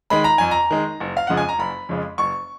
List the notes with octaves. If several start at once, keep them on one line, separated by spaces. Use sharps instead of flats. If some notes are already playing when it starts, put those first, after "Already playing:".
D#3 G#3 B5
A#5
F2 G#5
A#5
D#3 G#3
F#1
F5
F2 C#3 F3 G#3 F#5
G#5
A#5
F#1 B5
F2 C#3 F3 G#3
F#1 C#6